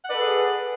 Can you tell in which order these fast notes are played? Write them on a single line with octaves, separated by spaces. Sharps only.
F#5 D5 B4 A4 G#4